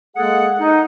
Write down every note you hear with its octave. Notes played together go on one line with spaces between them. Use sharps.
G#3 A#3 G#4 A4 F#5
D#4